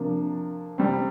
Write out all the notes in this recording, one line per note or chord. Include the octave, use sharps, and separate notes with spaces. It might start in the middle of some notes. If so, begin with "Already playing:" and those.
Already playing: C3 F3 A#3 D4
C3 G3 C4